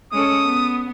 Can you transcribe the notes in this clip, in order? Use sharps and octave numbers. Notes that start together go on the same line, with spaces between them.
G#3 C#4 A4 D#6
B3